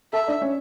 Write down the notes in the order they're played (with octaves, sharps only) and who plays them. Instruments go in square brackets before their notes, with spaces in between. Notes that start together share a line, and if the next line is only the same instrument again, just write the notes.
[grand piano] A4 A5 [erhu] E5
[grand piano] D4 D5
C#4 C#5